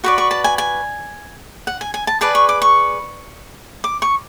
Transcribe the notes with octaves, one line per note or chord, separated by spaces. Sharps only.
F#4 B4 D5 C#6
C#6
A5
G#5
G#5
F#5
G#5
G#5
A5
G#4 B4 D5 A5
C#6
D6
C#6
D6
C#6